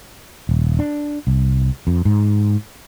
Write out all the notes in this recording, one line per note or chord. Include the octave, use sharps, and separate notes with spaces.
D#1
D4
C2
F2
G#2